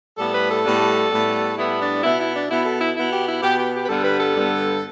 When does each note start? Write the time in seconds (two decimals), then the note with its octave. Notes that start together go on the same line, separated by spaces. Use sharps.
0.18 A2 G3 B3 A4
0.34 B4
0.50 A4
0.65 A2 G3 B3
1.12 A2 G3 B3
1.58 A2 G3 B3 E4
1.80 D4
2.03 B2 B3 E4
2.19 E4
2.35 D4
2.50 B2 B3 E4
2.65 A4
2.81 E4
2.96 B2 B3 E4
3.12 G4
3.28 E4
3.42 B2 B3 G4
3.58 G4
3.74 G4
3.84 B4
3.89 G2 D3 G3 B3 A4
4.04 B4
4.20 A4
4.36 G2 D3 G3 B3